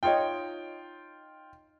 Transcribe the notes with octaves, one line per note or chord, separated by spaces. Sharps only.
D#4 F4 C#5 D#5 G5